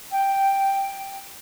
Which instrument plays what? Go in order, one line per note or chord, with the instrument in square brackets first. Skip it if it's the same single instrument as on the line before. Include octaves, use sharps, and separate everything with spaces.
[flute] G5